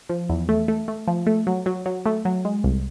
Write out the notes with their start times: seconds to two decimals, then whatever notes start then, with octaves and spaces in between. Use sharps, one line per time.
0.09 F3
0.29 E2
0.49 A3
0.68 A3
0.88 A3
1.08 F3
1.27 A3
1.47 F#3
1.66 F#3
1.86 F#3
2.06 A3
2.25 F#3
2.45 G#3
2.64 C2